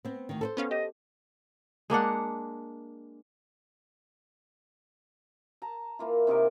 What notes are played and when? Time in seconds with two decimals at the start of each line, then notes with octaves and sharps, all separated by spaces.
0.05 B3 C4
0.29 D2 D#3
0.41 A4 B4 C5
0.57 B3 C#4 F5
0.71 G4 D#5
1.90 G#3 A#3 D4 F#5
5.62 A5 A#5
5.99 E3 A#3 F4
6.27 C3 D#3 G4 A#4